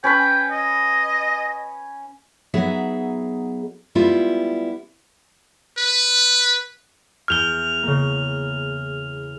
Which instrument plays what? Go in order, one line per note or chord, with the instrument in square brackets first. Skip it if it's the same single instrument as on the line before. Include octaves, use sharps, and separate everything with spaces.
[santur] C#4 B4 B5 [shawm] G5
[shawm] D#5
[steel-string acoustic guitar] F#3 B3 D#4 G#4 E5 F#5
G3 G#3 B3 E4 F4
[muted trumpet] B4
[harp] E2 G6 [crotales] F6 F7 G7
[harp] C#3 A#3